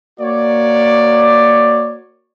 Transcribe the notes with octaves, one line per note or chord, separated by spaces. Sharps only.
A#3 F#4 C#5 D5